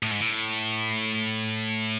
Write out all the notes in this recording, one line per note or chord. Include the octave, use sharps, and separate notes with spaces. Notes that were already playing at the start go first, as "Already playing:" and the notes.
A2
G#2
A2